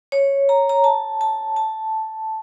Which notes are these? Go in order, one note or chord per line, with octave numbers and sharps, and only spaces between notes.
C#5
A#5
A#5
A5
A5
A5